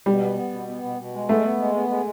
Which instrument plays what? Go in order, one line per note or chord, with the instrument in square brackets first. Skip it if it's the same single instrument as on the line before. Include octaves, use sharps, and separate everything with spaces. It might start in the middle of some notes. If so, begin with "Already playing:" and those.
[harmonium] B2 [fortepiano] G3
[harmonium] B3
B3
B2
B3
B2
B2
G#3
[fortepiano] A3 [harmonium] B3
[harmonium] B3
G#3
B3
G#3